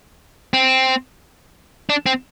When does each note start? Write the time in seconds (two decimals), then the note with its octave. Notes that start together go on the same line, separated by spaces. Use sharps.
0.54 C4
1.90 D4
2.06 C4